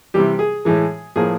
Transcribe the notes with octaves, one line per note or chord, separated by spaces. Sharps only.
C3 E3 G3 G4
G#4
A2 E3 G#3
A2 F3 A#3 G#4